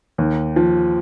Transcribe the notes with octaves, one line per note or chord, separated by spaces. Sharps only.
D#2
F3